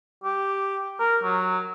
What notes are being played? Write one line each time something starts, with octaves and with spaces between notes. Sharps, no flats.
G4
A#4
F#3